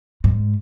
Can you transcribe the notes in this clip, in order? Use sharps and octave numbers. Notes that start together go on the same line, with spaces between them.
G#2